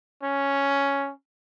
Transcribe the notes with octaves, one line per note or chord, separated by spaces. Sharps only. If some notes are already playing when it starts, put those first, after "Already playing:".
C#4